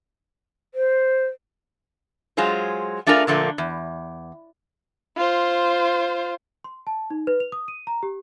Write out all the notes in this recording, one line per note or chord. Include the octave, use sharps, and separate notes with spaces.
C5
F#3 G#3 F4 G#4 C5
A3 D4 F4 G#4 A#4 F5
A#2 D3 F3 A3 A#3
E2
F4 C5
C6
A5
D#4
B4
F7
D#6
D#7
A#5
G4